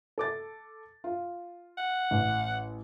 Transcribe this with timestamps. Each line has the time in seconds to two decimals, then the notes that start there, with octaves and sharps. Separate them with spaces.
0.18 A4 D6 A6
1.04 F4
1.78 F#5
2.11 A1